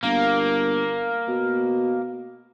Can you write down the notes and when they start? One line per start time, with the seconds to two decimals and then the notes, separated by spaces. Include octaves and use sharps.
0.04 G1 A#3
1.28 B2